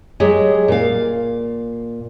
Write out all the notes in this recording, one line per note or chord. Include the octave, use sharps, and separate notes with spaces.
F#3 G#3 G4 G#4
A#2 F5